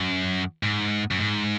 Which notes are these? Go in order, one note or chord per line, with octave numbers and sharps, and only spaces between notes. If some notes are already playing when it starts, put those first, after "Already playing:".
Already playing: F#2
G#2
F#2
G#2